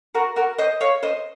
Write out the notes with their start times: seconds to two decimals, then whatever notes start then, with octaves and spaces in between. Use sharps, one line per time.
0.15 F#4 A#4
0.36 F#4 A#4
0.58 C5 D#5
0.81 C#5 F5
1.03 C5 D#5